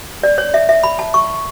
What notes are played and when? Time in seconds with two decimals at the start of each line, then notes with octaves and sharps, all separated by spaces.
0.23 D5
0.38 C#5
0.54 E5
0.69 E5
0.83 B5
0.99 A5
1.14 C#6